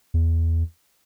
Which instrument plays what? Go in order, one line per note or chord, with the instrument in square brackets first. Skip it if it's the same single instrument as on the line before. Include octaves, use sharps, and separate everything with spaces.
[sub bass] E2